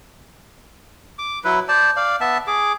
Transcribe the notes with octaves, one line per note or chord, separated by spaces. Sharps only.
D6
F#3 E4 B4
C5 D5 A5
D5 F5
B3 E5 A5
G#4 D6